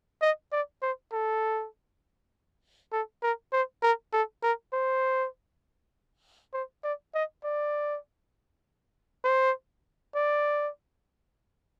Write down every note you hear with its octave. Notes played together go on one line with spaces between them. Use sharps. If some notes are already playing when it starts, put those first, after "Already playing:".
D#5
D5
C5
A4
A4
A#4
C5
A#4
A4
A#4
C5
C5
D5
D#5
D5
C5
D5